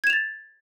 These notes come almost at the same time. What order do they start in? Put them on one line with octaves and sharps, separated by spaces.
G#6 E7 F7 A6